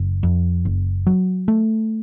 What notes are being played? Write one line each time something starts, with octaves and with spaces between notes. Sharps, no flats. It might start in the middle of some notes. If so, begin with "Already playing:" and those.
Already playing: F#1
F2
F#1
F#3
A3